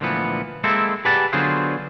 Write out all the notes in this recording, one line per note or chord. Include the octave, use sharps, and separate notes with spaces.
D2 A#2 E3 F3 B3
G#3 A#3 C4 E4 A4 E5
G4 G#4 B4 D5 F#5 A5
D3 F#3 B3 F4 G#4 C5